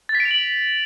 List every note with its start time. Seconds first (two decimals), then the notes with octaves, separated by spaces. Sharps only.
0.09 A6
0.15 B6
0.20 D7
0.25 F7
0.31 F#7